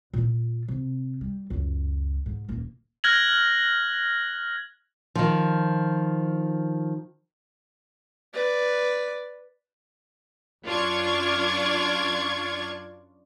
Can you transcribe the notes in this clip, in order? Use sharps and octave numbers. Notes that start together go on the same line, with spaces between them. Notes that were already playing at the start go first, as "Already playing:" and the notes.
A#2 F4
C3
G3
C#2 F#2
G#2
D#1 A#3
F6 F#6 G#6 A#6 F#7
D#3 F3
B4 D5
F#2 D4 F4 D5 C#6 G#6